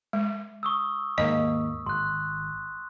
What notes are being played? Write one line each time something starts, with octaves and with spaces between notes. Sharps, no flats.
G#3
C#6 D#6 E6
D#2 G#2 A#3 D#5
G#1 C6 F#6